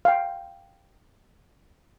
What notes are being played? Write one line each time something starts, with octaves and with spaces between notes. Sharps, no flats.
F5 G5